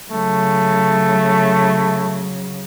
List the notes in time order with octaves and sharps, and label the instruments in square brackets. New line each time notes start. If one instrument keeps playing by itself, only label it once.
[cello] C#3 F#3 [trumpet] A3